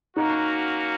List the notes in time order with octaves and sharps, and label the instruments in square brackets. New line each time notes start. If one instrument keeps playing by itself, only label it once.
[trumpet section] A#3 C#4 F#4 [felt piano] D#4